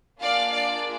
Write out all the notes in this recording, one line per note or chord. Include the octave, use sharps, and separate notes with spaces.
A#3 D4 F4 G#4 D5 F5
D5